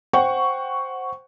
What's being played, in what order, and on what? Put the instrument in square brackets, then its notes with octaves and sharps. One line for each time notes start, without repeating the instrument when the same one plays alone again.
[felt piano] C5 F#5 G5 C#6